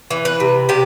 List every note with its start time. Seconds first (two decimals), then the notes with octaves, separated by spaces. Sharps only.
0.11 E3
0.25 B4
0.40 C3
0.69 C3 G4